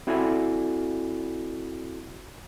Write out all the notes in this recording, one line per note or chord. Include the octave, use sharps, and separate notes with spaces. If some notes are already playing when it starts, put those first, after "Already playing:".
C4 E4 F#4 A4 D5 G#5